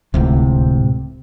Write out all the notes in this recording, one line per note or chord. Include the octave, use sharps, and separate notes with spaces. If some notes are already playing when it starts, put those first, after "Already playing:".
D1 C#2 A2 C3